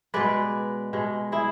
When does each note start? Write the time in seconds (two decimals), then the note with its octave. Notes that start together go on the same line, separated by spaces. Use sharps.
0.14 B2 G#3 B4 D5
0.93 B2 G#3
1.32 E4 G#4